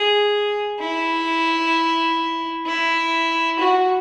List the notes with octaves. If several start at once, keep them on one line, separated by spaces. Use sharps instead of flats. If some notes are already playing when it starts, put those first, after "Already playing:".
Already playing: G#4
E4
E4
F#4